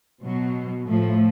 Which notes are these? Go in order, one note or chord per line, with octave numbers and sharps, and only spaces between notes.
B2 F#3
A2 F3 A3